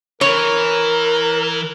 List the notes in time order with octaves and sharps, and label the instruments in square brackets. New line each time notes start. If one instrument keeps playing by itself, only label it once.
[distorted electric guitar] E3 [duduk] A#4 [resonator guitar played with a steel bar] C#5